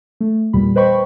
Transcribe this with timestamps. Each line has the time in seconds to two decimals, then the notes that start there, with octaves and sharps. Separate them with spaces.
0.20 A3
0.53 E2 A#2 G3 B5
0.76 B4 C5 D#5 G5 B5 C#6